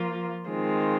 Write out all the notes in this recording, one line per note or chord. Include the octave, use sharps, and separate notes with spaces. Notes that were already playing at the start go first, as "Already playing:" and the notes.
Already playing: F3 A#3 F4
D#3 G#3 C4 F4